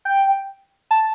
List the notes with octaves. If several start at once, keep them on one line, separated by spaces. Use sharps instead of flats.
G5
A5